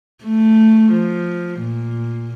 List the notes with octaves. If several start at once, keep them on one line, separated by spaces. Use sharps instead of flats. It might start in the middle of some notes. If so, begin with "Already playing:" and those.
A3
F3
A#2